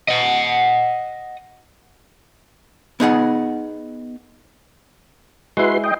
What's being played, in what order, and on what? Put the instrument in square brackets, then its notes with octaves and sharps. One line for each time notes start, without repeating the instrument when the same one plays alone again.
[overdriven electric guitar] D#5 F#5
[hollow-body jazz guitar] B3 D#4 G#4 F#5
[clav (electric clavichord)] G#3 E4 [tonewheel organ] F#4 B4 C6
[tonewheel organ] D#5 G5